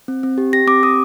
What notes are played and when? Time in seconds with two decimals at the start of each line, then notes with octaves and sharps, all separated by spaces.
0.08 C4
0.23 C4
0.38 G4
0.53 G4 A#6
0.67 C4 D6
0.83 G4 D#6